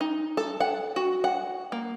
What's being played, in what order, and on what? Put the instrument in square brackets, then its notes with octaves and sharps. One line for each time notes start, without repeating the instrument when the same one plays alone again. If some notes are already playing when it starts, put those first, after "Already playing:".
[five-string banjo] D#4
A4
F#5
F#4
F#5
A#3